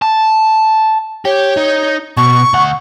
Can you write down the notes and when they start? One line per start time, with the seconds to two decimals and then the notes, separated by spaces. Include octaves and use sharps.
0.02 A5
1.25 G4 C#5
1.57 D#4
2.17 B2 C#6
2.54 D2 F#5